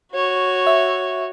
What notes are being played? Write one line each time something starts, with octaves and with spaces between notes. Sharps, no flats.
F#4 C#5
E5